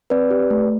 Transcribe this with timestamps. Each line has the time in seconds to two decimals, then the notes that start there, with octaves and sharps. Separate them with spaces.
0.10 C4 B4 D5
0.31 G4
0.51 A3